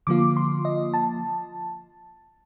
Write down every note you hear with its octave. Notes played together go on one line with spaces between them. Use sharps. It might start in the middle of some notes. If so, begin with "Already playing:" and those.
D3 F3 A#3 F4 D6
C6
D#5
A5